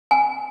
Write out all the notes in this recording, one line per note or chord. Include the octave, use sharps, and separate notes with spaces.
G#5